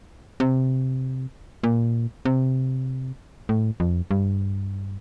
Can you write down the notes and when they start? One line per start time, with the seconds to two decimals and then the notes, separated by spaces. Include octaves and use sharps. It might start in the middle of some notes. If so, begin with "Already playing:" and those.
0.40 C3
1.64 A#2
2.25 C3
3.49 A2
3.80 F2
4.11 G2